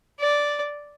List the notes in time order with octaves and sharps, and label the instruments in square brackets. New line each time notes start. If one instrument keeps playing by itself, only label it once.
[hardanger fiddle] D5